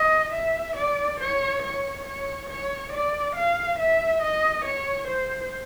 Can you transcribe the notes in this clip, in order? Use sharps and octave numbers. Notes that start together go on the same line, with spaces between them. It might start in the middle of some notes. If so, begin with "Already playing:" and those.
Already playing: D#5
E5
D5
C#5
C#5
C#5
C#5
D5
F5
E5
D#5
C#5
C5